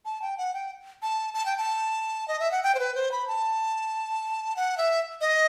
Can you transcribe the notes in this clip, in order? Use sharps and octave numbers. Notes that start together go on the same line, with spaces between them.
A5
G5
F#5
G5
A5
A5
G5
A5
D#5
E5
F#5
G5
C5
B4
C5
B5
A5
F#5
E5
D#5